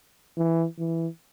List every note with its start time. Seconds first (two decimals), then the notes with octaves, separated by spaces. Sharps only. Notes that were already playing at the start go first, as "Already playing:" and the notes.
0.37 E3
0.79 E3